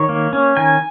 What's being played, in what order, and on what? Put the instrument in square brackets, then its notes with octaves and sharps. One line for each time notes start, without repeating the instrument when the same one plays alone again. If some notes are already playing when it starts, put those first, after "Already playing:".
Already playing: [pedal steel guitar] D#3 C#5
A#3
C#4
D#3 G#5